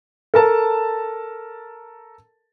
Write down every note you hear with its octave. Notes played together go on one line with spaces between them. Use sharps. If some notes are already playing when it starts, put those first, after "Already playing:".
A4 A#4 A5